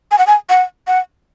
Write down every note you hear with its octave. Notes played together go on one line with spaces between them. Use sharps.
G#5
F#5
G#5
F#5
F#5